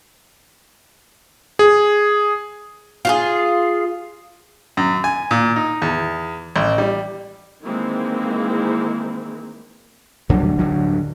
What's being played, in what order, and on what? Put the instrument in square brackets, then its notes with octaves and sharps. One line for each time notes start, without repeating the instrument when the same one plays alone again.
[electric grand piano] G#4
[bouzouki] F4 F#4 G#4
[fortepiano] F#2
G#5
A#2
D#4
E2
A1
G3
[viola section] D#3 E3 G#3 A#3 C4 E4
[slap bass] D2 D3 F#3 G3
D1 G2 D3 F#3